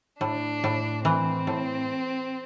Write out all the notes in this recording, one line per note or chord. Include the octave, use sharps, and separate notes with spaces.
A2 D4
A2
E3 C4
A2